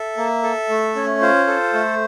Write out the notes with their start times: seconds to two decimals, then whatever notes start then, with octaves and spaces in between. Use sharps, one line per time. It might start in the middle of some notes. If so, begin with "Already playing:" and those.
Already playing: A4 E5
0.17 A#3
0.43 A4
0.69 A3
0.96 C#4
1.21 F4 C5
1.47 A4
1.73 A3